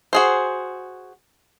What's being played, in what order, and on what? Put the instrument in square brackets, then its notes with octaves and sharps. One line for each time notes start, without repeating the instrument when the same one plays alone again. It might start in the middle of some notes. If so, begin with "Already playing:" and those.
[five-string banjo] F#4 G#4 C5